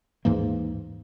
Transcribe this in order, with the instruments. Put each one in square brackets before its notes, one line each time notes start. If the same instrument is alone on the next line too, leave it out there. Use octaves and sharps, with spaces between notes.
[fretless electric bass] D#2 G#2 E3 A#3